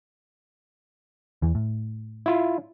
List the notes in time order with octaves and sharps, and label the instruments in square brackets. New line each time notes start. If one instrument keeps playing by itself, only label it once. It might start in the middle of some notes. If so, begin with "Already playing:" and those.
[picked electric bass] E2 E3
A2
[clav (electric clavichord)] E4 F4